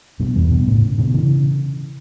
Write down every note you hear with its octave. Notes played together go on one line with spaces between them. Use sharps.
G2 B2
E2 G2
G2 B2
A2 C#3
B2 D3
C#3 E3